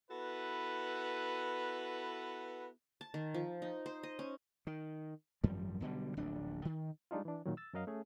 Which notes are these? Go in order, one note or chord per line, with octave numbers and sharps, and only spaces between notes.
B3 E4 F#4 A4 B4
A5
D#3
F3
D#4
C5
D#5
C#4
D#3
G#1 F#2 F3 G3
B1 B2 D3 G3
D1 A#1 D4
D#3
G3 G#3 D4 D#4 F4
E3 D4
A#2 D#3 F#3
E6 A6
F#2 F#3 A#4 D#5 F5
A3 C#4 G#4